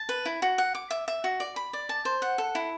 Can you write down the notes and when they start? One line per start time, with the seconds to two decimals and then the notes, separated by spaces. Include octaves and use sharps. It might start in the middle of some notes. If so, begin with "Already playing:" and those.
Already playing: A5
0.09 B4
0.25 E4
0.42 F#4
0.58 F#5
0.75 D6
0.91 E5
1.08 E5
1.24 F#4
1.40 D5
1.56 B5
1.73 D5
1.89 A5
2.05 C5
2.22 F#5
2.38 A4
2.55 E4